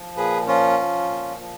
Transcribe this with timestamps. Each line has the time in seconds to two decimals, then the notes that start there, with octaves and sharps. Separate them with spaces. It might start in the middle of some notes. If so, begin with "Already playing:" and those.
Already playing: F3
0.17 A#2 G#4 B4
0.47 F3 C#4 F4
0.79 F3
1.09 A#2
1.40 F3